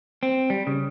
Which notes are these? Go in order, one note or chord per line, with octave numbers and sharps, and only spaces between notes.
C4
G3
C#3